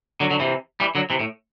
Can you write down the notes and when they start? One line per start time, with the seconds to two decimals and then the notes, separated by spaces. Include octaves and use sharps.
0.20 D3 F#3
0.31 D3 F#3
0.40 C3 E3
0.80 E3 G3
0.95 D3 F#3
1.10 C3 E3
1.20 A2